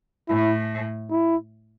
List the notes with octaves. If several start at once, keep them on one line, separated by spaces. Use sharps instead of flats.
A2 E4
E4